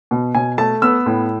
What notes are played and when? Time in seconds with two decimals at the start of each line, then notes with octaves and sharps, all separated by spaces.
0.11 B2
0.35 B2 G#5
0.58 A3 A5
0.82 B3 E6
1.06 A2